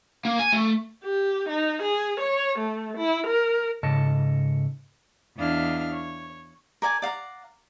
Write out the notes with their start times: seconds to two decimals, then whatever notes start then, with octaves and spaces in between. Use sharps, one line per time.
0.25 A#3
0.39 G#5
0.53 A3
1.04 G4
1.49 D#4
1.82 G#4
2.20 C#5
2.58 A3
2.97 E4
3.27 A#4
3.83 G#2 C#3 A4 D#5 A5
5.37 E2 D4 E4 D#5 F5 F6
5.91 C#5
6.82 A#4 D5 G#5 A5
7.02 D5 F5 F#5 A#5